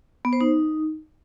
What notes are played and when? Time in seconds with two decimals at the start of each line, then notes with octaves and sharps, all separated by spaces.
0.25 B3
0.33 C5
0.41 D#4